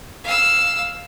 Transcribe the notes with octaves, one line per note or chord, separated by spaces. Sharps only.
F5 E6